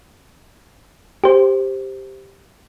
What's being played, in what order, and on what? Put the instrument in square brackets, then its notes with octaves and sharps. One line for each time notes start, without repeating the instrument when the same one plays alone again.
[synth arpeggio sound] G4 C5